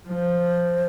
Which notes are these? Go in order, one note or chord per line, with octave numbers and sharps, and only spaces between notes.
F3 C5